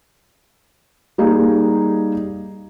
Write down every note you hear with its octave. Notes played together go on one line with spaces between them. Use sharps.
G3 A#3 D#4 G#4